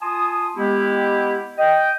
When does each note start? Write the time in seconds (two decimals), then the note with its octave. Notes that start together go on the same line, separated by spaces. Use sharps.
0.01 F4 G#5 A5 C6 D#6
0.56 G#3 B3 E4 G4
1.58 D#5 G5